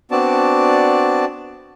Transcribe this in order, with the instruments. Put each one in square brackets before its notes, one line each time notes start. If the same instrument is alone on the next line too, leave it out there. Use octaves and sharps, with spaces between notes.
[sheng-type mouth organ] B3 C4 D4 F#4 D5 A5